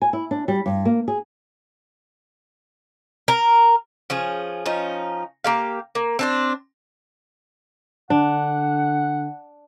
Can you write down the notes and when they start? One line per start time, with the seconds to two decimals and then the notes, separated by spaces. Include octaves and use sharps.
0.02 G#5
0.13 E4
0.31 D4
0.48 G3
0.66 G2
0.85 A#3
1.08 G#4
3.28 A#4
4.10 F3 C#4 G#4
4.66 F3 C#4 D#4
5.44 A#3 G4 F5
5.95 A#3
6.19 C4 D4 C5
8.10 D3 D4 F#5